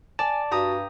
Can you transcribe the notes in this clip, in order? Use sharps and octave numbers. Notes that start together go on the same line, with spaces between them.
D5 G#5 A5
G2 F#4 G4 A#5 D#6